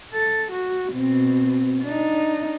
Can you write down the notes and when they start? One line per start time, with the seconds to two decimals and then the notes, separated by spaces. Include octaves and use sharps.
0.14 A4
0.51 F#4
0.93 B2 C4
1.84 D4 D#4